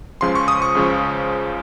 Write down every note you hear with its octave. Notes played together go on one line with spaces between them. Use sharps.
C#2 C#3 F3 C6
C#6
D#6
C#6
C#2 C#3 F3